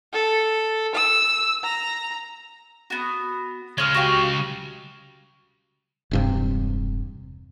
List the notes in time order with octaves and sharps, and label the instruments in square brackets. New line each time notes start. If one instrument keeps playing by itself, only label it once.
[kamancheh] A4
E6
A#5
[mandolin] B3 F#4
[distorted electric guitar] C#3 G#3 [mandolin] C#5 F6
[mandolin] F#4 G4 F5
[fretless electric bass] E1 G2 C3